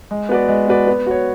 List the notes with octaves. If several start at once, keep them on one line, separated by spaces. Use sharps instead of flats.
G#3
B3 F#4 B4 D5
G#3
B3 F#4 B4 D5
B3
F#4 C#5